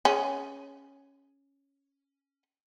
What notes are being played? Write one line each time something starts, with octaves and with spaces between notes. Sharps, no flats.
C#4 G#4